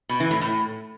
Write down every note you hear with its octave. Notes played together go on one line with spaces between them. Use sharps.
B2
E3
A2
A2